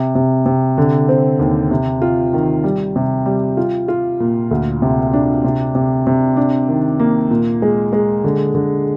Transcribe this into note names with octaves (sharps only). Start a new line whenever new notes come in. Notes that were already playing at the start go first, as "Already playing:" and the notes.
Already playing: C3
C3
C3
D3
C4
D#2
C3
F4
D#3
G3
C3
G3
F4
F4
A#2
D2
C3
D4
C3
C3
C3
D4
D#3
A#3
A#2
G#3
G#3
D3
D3